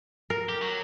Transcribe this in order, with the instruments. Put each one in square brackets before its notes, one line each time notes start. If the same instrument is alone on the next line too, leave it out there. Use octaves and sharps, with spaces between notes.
[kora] A#4
[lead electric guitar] G4
F#3